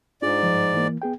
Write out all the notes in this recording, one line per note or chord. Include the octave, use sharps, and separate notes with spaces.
G#2 D4 F4 G#4 D5
G2 F3
E3 A#3
B3 G#4 G5